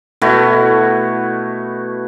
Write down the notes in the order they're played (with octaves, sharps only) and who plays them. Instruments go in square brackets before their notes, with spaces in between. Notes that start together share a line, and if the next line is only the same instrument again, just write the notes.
[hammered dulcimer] B2 A3 E4 F#4